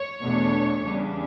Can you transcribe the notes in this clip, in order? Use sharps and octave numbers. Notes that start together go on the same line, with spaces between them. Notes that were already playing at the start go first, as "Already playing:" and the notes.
Already playing: C#5
E2 B2 A3 D4
E2 C#3 G3 D4